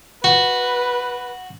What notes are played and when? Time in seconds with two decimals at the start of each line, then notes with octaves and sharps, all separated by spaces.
0.24 F#4 B4